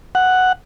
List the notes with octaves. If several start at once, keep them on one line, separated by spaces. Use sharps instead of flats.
F#5